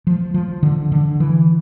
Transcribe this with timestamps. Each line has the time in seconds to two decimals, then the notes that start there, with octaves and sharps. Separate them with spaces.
0.07 F3
0.34 F3
0.63 D3
0.92 D3
1.20 E3